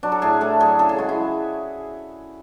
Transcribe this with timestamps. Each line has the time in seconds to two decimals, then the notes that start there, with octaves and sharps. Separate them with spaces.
0.03 F#3 D4
0.12 A4
0.22 A2 G#4
0.41 A3 A4
0.60 F#3 G#4
0.79 C#3 A4
0.89 G#4
0.98 G#3 F#4
1.09 E4